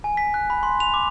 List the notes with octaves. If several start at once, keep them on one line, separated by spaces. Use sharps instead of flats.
G#5
B6
F#6
B5
C6
F7
D6